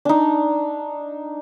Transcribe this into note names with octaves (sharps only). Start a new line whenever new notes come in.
D4 D#4